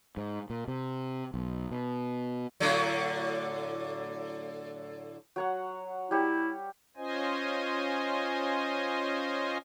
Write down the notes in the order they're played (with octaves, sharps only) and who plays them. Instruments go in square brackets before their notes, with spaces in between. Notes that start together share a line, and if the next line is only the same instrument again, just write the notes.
[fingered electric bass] G#2
A#2
C3
B1
B2
[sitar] A2 D3 F#3
[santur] F#3 C#5 F#5
[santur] G3 G4 C#5 [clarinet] E4
[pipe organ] C#4 F4 C5 D#5 G#5